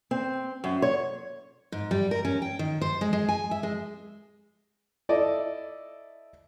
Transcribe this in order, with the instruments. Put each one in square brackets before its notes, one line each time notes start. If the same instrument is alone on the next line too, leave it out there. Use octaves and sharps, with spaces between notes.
[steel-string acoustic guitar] C4
F#2
C#5
G#2
G3
A#4
C#4
G5
D#3
C5
G#3
G#3
G#5
E5
G#3
[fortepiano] E4 A4 D5 D#5